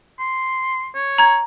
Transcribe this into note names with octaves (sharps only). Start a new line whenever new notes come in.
C6
C#5
A#5 G#6